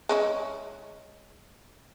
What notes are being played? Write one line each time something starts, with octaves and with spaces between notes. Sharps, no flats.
G#3 C#4 E4